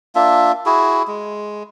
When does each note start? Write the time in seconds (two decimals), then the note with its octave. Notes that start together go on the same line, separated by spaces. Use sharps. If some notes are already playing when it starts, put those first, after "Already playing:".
0.15 A#3 D4 F4 E5
0.66 E4 F#4 G#4
1.07 G#3